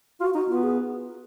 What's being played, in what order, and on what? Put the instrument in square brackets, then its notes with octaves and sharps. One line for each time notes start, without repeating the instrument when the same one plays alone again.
[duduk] F4 [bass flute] F#4
[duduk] D#4 [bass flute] F#4
[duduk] B3 [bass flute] F4
[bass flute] G#4